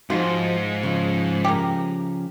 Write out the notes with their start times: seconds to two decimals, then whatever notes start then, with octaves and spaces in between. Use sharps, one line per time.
0.10 G#2 F3 D#4 F4 F#4
0.83 C#3 F3
1.45 G4 A#4